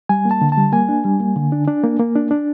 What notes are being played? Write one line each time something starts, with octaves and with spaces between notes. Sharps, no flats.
G3 G#5
A#3
A5
D3
A5
G3
A#3 G#5
D4
G3
A#3
D3
D4
D4
A#3
A#3
D4
D4